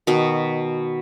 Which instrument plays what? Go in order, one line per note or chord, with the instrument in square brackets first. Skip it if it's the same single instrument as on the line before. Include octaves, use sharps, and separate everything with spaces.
[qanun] B2 D#3